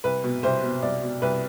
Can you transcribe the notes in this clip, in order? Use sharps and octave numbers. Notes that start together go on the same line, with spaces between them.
C2 B4
B2
C2 C5
B2
C2 D5
B2
C2 B4